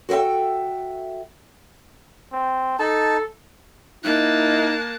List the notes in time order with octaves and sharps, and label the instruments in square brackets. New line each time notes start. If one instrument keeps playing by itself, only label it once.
[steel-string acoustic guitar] F#4 A4 B4 E5 G5
[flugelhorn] C4
[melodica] D#4 A5 [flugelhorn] A4
[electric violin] A#3 A5 [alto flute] D#4 [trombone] E4 [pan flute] F#6